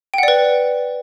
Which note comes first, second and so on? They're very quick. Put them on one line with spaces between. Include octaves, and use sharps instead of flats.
G5 F#5 D5 B4